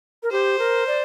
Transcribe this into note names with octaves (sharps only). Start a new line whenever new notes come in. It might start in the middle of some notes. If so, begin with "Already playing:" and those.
A#4
G4 C5
A#4
D5